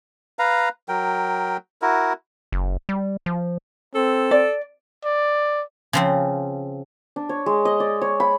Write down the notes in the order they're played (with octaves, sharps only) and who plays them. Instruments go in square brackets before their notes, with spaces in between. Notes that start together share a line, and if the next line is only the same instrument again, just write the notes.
[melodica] B4 F5 A#5
F#3 A#4 G5
E4 F#4 A#4
[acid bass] F#1
G3
F3
[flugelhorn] C4 [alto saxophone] A4
[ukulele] D5
[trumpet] D5
[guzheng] C#3 F3 C4
[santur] D4
C#5
G#3
D#5
D5
C#5
B5